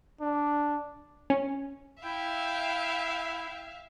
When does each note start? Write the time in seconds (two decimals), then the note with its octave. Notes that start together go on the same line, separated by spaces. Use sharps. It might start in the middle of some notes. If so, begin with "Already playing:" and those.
0.21 D4
1.30 C#4
2.03 E4 E5 F5 G5